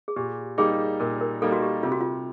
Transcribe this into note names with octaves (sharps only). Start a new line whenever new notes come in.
G#4
A#2 G4
G3 A#3 D#4 G#4
A#2 A#4
A#4
G3 A#3 D#4 A4
F#4
G4
C3 F4
F#4
F4